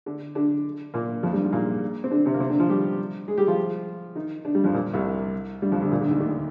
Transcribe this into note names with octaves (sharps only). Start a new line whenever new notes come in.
D3 D4
D3 D4
A#2 A#3
F2 F3
G2 G3
G#2 G#3
A#2 A#3
C4
D3 D4
C3 C4
A#3
C3 C4
D3 D4
F3 F4
G3 G4
G#3 G#4
G3 G4
F3 F4
D#3 D#4
D3 D4
G2 G3
F2 F3
A#2
C2 C3
G2 G3
F2 F3
D2 D3
A#2
D2 D3
D#2 D#3
D2 D3